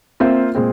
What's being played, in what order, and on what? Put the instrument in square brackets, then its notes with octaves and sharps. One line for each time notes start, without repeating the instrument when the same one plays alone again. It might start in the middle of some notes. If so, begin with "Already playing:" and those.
[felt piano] A#3 F4 C5 E5 [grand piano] C4
[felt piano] A#2 G#3 C4